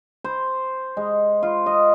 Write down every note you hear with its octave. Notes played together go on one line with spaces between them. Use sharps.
C5
G#3
F4
D#5